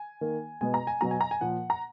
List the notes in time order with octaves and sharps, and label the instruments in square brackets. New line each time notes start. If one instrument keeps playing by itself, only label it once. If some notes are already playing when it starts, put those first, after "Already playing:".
Already playing: [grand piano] G#5
D#3 A#3
B2 G#3 B3 G#5
A#5
G#5
B2 F#3 B3 A#5
G#5
A#5
G#5
A#2 F3 A#3 F#5
A#5